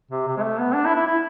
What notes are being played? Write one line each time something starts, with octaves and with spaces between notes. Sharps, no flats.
C3
C3
G#3
A3
B3
D4
E4
E4
E4